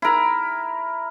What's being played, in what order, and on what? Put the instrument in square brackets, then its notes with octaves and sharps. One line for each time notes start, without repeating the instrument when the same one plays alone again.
[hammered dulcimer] E4 A#4